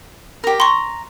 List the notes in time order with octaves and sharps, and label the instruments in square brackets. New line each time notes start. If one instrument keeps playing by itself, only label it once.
[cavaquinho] G4 A#4
[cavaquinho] A#5 [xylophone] C6 C#6